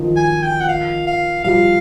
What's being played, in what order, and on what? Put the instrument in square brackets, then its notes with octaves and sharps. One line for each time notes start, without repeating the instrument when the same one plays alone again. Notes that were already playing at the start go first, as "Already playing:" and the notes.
Already playing: [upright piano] D#3 F3
[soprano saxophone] G#5
G5
F#5
F5
F5
[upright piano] F3 G3 [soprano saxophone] F5